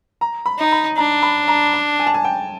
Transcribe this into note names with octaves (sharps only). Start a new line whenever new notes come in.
A#5
B5
D#4
B5
D4 A#5
B5
A#5
A5
G#5
A5
G#5
G5